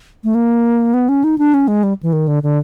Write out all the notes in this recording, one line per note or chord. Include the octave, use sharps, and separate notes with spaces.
A3
A#3
B3
C#4
D#4
D4
C#4
G#3
G3
E3
D#3
D3
D3